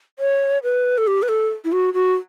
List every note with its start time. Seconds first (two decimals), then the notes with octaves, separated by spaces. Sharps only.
0.19 C#5
0.63 B4
0.98 A4
1.07 G4
1.23 B4
1.29 A4
1.65 E4
1.72 F#4
1.94 F#4